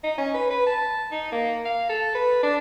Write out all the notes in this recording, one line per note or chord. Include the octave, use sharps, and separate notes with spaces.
D#4
C#4
B4
B4
A5
D#4
A#3
F5
A4
B4
D4